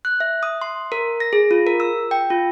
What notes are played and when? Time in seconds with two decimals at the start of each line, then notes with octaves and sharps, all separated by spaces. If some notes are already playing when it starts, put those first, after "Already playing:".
0.05 F#6
0.20 E5
0.43 D#6
0.61 C6
0.92 A#4
1.20 A#6
1.33 G#4
1.51 F4
1.67 A#4
1.80 E6
2.11 G5
2.30 F4